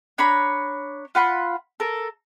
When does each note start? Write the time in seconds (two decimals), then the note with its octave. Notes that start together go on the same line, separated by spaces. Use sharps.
0.18 D4 C#5 A#5 B5
1.15 F4 F#5 B5 C6
1.80 A4 A#4